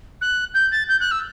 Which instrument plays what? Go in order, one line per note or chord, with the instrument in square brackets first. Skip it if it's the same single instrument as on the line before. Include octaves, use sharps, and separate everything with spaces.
[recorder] F#6
G6
A6
G6
F#6
E6